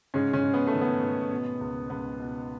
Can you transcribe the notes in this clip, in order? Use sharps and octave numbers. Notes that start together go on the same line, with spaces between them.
G#2 C#3 C#4
C#3 C#4
G#2
B3
A3
D#3
B3
G#2
B2
C#2
C#2 B3
B2